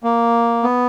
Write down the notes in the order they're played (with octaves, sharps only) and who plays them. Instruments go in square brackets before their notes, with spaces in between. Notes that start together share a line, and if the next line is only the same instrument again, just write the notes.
[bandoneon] A#3
B3